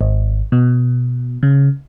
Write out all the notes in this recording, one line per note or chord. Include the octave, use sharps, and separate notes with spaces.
G#1
B2
C#3